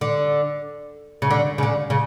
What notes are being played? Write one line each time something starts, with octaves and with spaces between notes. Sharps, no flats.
D3
C#3
D3
C#3
D3
C#3